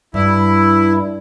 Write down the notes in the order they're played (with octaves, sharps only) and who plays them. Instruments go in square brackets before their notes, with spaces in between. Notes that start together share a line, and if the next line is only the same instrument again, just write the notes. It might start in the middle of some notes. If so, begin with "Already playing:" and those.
[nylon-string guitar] G2 [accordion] E4